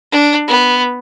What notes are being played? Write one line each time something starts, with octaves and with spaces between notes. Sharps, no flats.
D4
B3